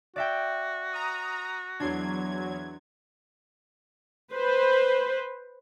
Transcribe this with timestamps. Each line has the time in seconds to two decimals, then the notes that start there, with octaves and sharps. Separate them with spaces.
0.16 F#4 D5 E5 G5
0.93 A#5 D#6
1.80 E2 F#3 D4 C6 G#6
4.32 B4 C5